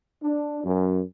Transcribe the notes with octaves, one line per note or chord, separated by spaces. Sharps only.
D4
F#2